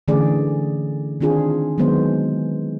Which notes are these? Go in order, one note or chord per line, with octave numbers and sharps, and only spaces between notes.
D3 E3 A3 C#4 G#4 D5
D#3 C4 D4 F4 G#4
D#3 F#3 G#3 B3 C5